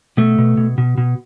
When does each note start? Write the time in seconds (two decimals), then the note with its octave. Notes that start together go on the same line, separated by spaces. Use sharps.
0.17 B2 A3
0.38 B2
0.57 B2
0.78 B2
0.98 B2